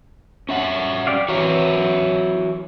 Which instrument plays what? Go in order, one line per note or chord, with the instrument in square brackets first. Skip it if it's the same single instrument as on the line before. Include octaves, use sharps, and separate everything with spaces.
[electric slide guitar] C#4 E5 F#5
[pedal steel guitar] G4 D5 F5
[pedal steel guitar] E3 [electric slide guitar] F#4 C#5 E5